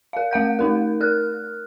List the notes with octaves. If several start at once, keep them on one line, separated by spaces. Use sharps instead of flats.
A#4 F5
A3 F5 F#5 G6
A3 D#4 A#4
A#4 F6 F#6